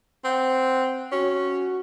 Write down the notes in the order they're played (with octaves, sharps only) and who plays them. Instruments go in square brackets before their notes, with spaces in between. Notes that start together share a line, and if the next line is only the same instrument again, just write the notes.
[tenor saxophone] C4 [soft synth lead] F#5
[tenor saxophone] C#4 [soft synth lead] F#4